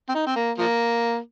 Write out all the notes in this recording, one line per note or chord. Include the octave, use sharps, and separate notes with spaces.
C4
D#4
C4
A#3
F3 A#3